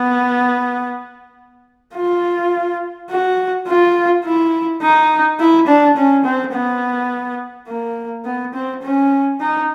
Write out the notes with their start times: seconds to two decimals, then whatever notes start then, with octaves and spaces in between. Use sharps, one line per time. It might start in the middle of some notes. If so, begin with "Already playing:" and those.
Already playing: B3
1.95 F4
3.10 F#4
3.68 F4
4.25 E4
4.82 D#4
5.39 E4
5.67 D4
5.97 C#4
6.25 C4
6.53 B3
7.68 A#3
8.25 B3
8.54 C4
8.82 C#4
9.40 D#4